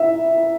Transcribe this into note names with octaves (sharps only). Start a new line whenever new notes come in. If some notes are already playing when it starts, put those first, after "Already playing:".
Already playing: E5